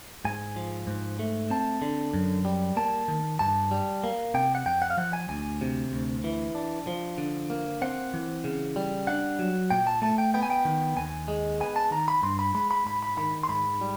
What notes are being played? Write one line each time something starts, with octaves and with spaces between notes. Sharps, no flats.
G#2 G#5
F3
G#2
A3
C4 A5
D3
F#2
G3
A#3 A5
D#3
G2 A5
G3
A#3
C3 G5
F#5
F2 G5
F#5
F5
F3 F#5
G#5
D2 G#5
C3
D2
E3
D4
F3
D3
A#3
C4 F#5
E3
C#3
G3
D4 F#5
F#3
A#2 G5
A5
A3 A5
G5
B3 G5
G#5
G5
D#3
D#2 G#5
G#3
B3 G#5
A5
D#3 A#5
B5
G2 C6
B5
G#3 B5
B5
G#2 B5
B5
D#3 B5
C6
G#2 B5
G3